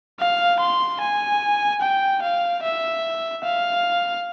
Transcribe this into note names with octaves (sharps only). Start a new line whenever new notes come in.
F5
C6
G#5
G5
F5
E5
F5